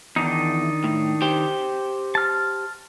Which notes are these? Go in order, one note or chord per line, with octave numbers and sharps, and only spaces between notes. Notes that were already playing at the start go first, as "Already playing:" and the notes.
E2 D#3 D4 D#4
A2
G4 C5 G5
A5 F6